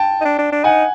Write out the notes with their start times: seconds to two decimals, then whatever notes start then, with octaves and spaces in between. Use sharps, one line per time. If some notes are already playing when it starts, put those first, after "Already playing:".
Already playing: G5 A5
0.21 D#4
0.25 D4
0.39 D4
0.52 D4
0.64 D#4 F#5 G#5